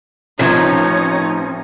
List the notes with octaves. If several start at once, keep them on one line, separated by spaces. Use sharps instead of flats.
A1 F3 C4 D#4 A#4 C#5